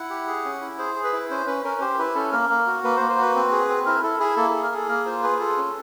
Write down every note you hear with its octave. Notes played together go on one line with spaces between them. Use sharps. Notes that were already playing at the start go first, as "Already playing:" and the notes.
Already playing: E4 F#5
G4
G#4
C#4
E4
G#4 C5
G#4
B4
E4
C#4 C5
C#4 B4
C#4 A#4
G4 C5
E4 B4
C#4 A4
A#3 A#4
A#3
F#4
A#3 B4
A#3 C5
C5
F#4 B4
C4
G#4
C4
E4 A#4
E4 A4
E4 G#4
A#3 A4
G#4 A4
A#4
G#4 A4
A#3 A#4
F4 C5
G#4 B4
F4 A4
C#4